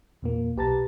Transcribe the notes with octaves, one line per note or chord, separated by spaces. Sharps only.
E2 A#2 A#3
B1 G4 B4 A5 A#5 A6